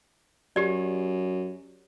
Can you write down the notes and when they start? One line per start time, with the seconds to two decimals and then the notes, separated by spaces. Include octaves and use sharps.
0.56 F#2 G4 D5